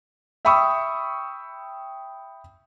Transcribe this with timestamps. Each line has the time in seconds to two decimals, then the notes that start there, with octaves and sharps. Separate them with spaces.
0.45 E5 G5 B5 C#6 D#6 E6